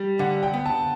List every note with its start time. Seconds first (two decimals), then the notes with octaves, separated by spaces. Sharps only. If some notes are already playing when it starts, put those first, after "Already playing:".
Already playing: G3
0.19 D3 F#5
0.43 G5
0.54 B3
0.65 A5